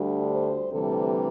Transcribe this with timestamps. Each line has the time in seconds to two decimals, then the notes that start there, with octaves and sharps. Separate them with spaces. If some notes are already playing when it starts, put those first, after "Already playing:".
Already playing: D2 D3 G3
0.29 C5
0.72 D2 C3 E3 G3 A4